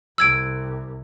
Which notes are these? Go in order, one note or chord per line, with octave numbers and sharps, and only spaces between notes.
C2 E6 G#6 D7